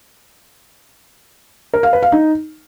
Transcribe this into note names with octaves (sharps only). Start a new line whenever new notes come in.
A#4
F5
B4
F5
D#4